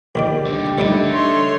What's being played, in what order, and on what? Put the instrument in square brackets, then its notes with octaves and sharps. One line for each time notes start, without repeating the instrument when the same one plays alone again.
[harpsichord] A#1 D#3 D5 [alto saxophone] G4
[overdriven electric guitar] C2 D3
[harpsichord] A#1 G3 D#4 [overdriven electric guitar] D3 [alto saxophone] A3
[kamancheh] C#5 C6